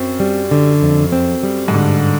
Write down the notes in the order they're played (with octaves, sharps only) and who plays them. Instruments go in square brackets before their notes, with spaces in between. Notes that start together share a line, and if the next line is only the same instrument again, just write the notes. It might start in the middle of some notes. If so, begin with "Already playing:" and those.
Already playing: [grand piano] F#2 [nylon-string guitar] C4
[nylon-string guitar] G3
D3
F2
C4
G3
[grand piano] G#2
[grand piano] G2 [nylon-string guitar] D3